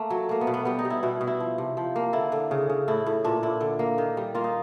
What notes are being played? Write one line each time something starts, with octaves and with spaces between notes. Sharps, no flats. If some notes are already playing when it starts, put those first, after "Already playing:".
Already playing: A3 A#3
F#3
A3 A#3
B3
B2
B3
G3 B3
D#4
G3
E4
B2 E4
B2
E4
F3
C3
F3
A#3
D3 E4
D3
C#3
C#3
A2 E4
A2
A#2 D4
A#2 E4
D3
A#3
D#3
G3
A#3 F4
D#4